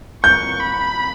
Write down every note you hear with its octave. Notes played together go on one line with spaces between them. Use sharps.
C#6 G6
B5